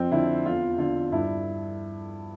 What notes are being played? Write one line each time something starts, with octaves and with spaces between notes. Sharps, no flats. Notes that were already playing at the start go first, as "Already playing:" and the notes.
Already playing: F2 C4
D3 E4
E2 F4
D3 F4
G2 E4